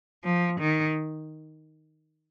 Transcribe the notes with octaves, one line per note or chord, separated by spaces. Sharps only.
F3
D#3